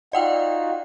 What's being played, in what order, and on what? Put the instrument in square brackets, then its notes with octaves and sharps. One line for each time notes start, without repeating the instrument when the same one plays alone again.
[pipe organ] D#4 F4 F#4 [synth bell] D5 F#5 G5